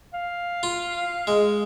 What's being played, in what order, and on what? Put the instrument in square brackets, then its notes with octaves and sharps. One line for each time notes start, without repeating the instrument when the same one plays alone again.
[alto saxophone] F5
[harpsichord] F4
G#3